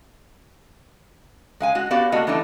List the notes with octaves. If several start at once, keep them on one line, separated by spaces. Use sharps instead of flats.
G#3 F5 G#5
G#3 F#4
B3 F#4 G4 D5 F5
A3 A#3 F#4 D#5
E3 G3 A3 B3 D4 D#4